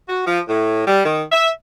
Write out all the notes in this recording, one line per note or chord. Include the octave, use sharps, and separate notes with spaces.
F#4
F3
A2
G3
D#3
E5